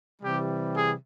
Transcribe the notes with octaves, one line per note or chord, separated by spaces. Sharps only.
C3 E3 G3 G4
G#4